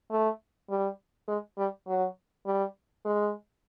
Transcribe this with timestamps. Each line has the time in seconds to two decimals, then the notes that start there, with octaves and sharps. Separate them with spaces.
0.11 A3
0.70 G3
1.28 G#3
1.58 G3
1.87 F#3
2.46 G3
3.05 G#3